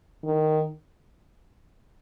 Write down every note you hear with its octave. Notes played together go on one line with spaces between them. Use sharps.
D#3